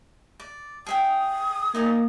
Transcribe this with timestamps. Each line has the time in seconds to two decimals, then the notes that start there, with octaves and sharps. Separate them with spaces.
0.40 D5
0.87 G#4 E5 G5 D#6
1.75 A#3 D#4 D5 G#5